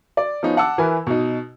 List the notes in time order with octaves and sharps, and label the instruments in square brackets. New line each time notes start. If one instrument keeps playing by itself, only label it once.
[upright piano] D5
F3 B3 C#4 D#4
F#5 A5 D6 E6
E3 E4 A#4 B4 G#5
B2 D#4